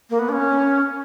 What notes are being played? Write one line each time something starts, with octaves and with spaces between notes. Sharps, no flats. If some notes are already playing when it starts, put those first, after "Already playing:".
A#3
B3
D4
C#4